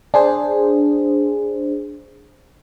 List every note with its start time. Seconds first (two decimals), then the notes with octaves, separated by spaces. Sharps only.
0.14 D4 G#4 C5